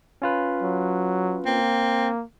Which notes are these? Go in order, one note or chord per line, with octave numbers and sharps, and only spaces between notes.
C#4 F4 B4
F#3
A#3 C4